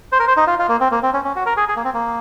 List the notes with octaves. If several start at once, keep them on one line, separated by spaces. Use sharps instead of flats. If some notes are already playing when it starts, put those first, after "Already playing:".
C5
A#4
C5
D#4
F4
F4
A#3
C4
A#3
C4
C#4
C#4
F#4
A#4
G#4
G#4
A#3
C4
A#3